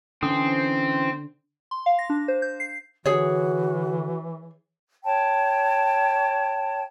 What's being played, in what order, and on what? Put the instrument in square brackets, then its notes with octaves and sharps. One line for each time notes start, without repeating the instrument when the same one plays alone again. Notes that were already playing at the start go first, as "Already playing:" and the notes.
[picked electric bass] D3 [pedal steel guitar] E3 C#4 D#6 [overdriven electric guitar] C4
[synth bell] C6
F5
A#6
D4
C5
G6
C7
[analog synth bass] D3 [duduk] E3 [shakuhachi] F#4 [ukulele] G#4 C#5
[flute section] C#5 G5 A5